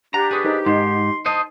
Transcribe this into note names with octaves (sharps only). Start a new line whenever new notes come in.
D4 G4 F#5 A#5
G#4 B4 C#6 D#6
D#4 A#4 C5
G#2 D#4 C6
C5 D#5 A5 D#6